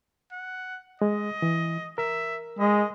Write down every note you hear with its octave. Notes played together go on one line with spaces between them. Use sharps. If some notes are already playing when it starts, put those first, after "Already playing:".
F#5
G#3 D#5
E3
A#4 E5
G#3 D#5